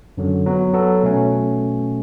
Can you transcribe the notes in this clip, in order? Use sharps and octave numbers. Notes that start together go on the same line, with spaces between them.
F#2 D3 F#3
F#3 B3 F#4
F#3 B3 F#4 A4
B2 A3 C#4